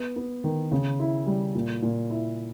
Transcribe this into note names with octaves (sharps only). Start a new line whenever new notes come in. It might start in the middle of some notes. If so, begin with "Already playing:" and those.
Already playing: B3
B3
D#3
C#3
E4
G3
A#2
A#2
E4